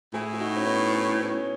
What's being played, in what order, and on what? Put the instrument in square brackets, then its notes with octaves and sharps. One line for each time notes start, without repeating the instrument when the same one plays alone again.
[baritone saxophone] A2 [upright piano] E4 G#4
[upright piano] E4
D#4 F#4
C#4
B3 D#4
C#4
C#4